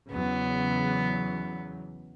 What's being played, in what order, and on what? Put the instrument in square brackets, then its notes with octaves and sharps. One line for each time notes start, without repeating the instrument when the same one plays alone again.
[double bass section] E2 C#3 F#3 [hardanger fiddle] B3